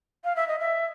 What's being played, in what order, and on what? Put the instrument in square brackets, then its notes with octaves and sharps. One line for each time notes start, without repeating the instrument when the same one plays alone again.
[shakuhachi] F5
E5
D#5
E5